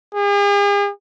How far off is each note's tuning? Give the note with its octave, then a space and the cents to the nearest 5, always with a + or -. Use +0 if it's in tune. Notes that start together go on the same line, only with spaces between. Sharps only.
G#4 -45